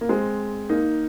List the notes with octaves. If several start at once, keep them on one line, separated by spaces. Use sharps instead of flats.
A#3
G#3 C4
A#3 D#4